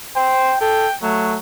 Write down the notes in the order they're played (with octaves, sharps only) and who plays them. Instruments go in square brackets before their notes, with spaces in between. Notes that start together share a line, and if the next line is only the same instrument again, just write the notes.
[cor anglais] C5 [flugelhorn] G5
[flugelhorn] A4 [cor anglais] G5
[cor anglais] F#3 [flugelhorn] A3